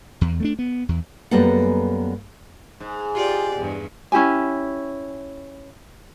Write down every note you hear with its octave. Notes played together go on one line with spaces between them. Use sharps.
E2
A3 A#3 D4
B3
E2
F#2 G3 A#3 B3 A4 F#5
G#2
F4 G4 D5
E2 G2
C#4 E4 G4 G#5